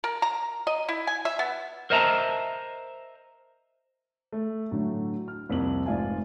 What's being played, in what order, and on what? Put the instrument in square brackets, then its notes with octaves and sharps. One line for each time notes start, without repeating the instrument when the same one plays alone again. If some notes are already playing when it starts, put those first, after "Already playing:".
[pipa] A#4
A#5
D#5
E4
G#5
E5
B3
[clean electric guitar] A#4 C5 D#5 E5 A5 A#5
[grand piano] A3
A2 D3 F#3
F6
C2 F2 A#3 F#7
F1 G#2 F4 D5 G#5